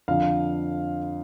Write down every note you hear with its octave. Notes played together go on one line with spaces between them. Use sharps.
F2 D3 F5